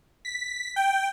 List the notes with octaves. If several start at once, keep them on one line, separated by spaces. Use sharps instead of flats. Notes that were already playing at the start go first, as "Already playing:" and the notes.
B6
G5